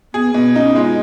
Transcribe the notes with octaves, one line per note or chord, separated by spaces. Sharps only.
B3 G#4
B2 B3
C#4 D#4
G#3 F4